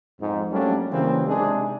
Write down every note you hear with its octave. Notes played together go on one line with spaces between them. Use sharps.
F2 G#2
F#3 G3 A3 A#3 C#4 D4
C#3 E3 F#3 G3 A#3 C4
C3 G#3 D4 D#4 G#4